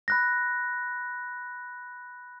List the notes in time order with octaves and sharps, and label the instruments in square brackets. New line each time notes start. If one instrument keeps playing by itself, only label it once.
[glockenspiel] B5 F#6 A#6